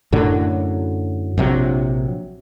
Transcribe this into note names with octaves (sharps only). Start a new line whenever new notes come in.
F#2 A2 D3 F#3
A#1 C3 F#3